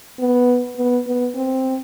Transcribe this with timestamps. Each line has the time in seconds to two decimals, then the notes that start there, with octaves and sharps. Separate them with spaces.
0.19 B3
0.77 B3
1.07 B3
1.35 C4